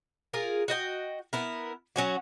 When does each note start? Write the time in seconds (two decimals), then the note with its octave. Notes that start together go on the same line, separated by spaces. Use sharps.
0.33 F4 G#4 A#4
0.68 F#4 D#5 G5
1.33 B3 E4 A#4
1.96 F#3 C#4 F#4